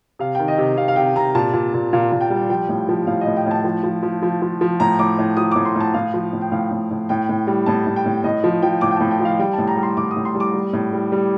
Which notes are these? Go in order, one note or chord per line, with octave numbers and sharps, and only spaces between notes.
C3 F5
D#3 G5
D#5
C3
C3 F5
F5
C3 G5
C3 A#5
A#2 A5
A#2
A#2
A#2 F5
A#2
G5
G3
F3 G5
A2
F3
A2 F5
D#5
A2
G5
A2 A5
F3
F3
F3
F3
F3
F3
A2 A#5
A2 D6
A2
F3 D#6
A2 D6
C6
A2 A5
A2 F5
F3
A2
G5
A2 F5
A2
A2
A2 G5
A2
G3
A2 A5
A2
G5
A2
A2 D#5
F3
F3 G5
A2 D6
G5
A2 A5
G5
F3 F5
G3 G5
A2 A5
A#5
G3
C6
A2 D6
D#6
A2
C6
G3
D6
G3
A2
G3
G3